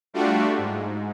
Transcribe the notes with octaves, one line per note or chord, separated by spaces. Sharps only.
G3 A3 D4 F4 F#4
G#2